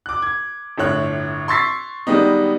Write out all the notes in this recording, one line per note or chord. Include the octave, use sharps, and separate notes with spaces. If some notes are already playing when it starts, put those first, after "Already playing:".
D6 F#6
G#6
G1 A2 C#5 F#6
C6 C#6 E6 A6 B6 C7
D#3 G3 G#3 B3 D#4